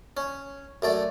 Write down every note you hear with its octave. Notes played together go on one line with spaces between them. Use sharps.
C#4
F#2 A3 D5